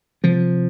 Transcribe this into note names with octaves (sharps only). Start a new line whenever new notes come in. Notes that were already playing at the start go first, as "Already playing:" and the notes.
C3 F3